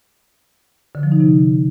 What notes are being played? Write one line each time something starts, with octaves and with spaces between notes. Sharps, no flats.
D3
F3
D#4
C3